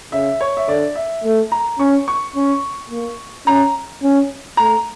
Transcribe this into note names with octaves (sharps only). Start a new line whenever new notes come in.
C#3 E5
C#5
E5
D3 D5
E5
A3
A#5
C#4 C#6
C#6
C#4
A#3
C#4 A#5
C#4
A3 A#5